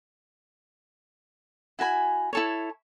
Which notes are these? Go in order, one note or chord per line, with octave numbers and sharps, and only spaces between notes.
E4 F#4 G#5 B5
E4 A4 C#5